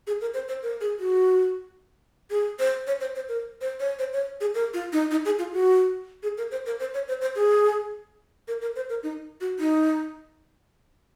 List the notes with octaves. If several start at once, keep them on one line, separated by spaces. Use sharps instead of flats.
G#4
A#4
C5
C5
A#4
G#4
F#4
G#4
C5
C#5
C5
C5
A#4
C5
C#5
C5
C#5
G#4
A#4
F4
D#4
D#4
G#4
F4
F#4
G#4
A#4
C5
A#4
C5
C#5
C5
C5
G#4
A#4
A#4
C5
A#4
D#4
F#4
D#4